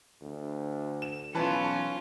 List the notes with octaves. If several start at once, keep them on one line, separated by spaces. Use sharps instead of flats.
D2
E7
B1 E3 C#4 F4 B4 A5
A5